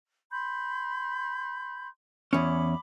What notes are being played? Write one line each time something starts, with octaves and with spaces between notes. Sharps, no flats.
B5 C6 G6
E2 C#4 B5 D6